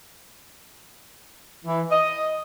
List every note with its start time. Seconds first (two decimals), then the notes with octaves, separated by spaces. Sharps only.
1.65 E3
1.90 D#5